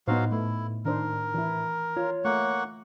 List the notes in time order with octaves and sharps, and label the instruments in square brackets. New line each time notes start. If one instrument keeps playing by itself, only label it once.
[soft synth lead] A2 [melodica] F#3 F#4 F5 [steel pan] B3 D#4 C5
[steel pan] A3 [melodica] E4
[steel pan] D#3 D4 C5 [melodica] A#4
[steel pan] E3 E4
[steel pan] F4 [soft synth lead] C#5
[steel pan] A3 [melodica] A#3 F#5 C#6